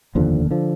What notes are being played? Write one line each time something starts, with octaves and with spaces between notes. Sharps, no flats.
F1 D#2 D3 F3
D3 F3